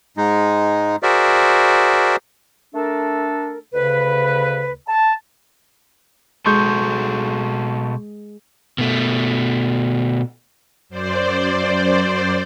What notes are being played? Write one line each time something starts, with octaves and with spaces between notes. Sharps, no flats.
G#2 G#3 D#4
F#4 G#4 A#4 C5 D5 E5
A3 D4 A4 A#4
D2 C#3 B4
A5
B2 G#3 F#4 A4 C6 C#6 G6
B2 A3
F#2 C5 D5